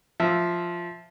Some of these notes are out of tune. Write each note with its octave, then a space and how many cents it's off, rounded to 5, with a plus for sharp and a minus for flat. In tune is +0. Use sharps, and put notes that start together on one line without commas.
F3 +0 E5 +0